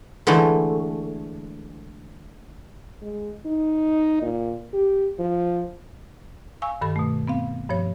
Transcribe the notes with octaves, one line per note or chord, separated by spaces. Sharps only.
D3 E3 G#3 A3
G#3
D#4
A#2
G4
F3
F5 G#5 C#6 E6
G2 D#3 A4 B5
B2 A3
B3 C4 F5
G2 F3 C#5